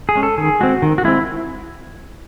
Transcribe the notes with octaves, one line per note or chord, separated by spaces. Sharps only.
G#4
G#3 C#4
A4
D#3 G#4
G#3 C4 F#4
D#3
F#4
G#3 C4 E4